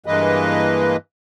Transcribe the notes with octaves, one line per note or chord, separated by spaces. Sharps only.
G2 E3 G#3 A#3 B4 D#5